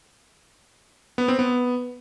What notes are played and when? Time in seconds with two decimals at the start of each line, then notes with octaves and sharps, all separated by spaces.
1.18 B3
1.28 C4
1.39 B3